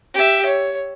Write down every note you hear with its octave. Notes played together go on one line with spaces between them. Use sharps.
G4 E5
C#5